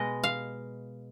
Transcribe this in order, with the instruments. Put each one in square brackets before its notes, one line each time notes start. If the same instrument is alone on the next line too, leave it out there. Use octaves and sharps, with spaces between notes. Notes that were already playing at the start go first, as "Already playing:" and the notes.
Already playing: [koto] B2 G#3 B4 D#5
F5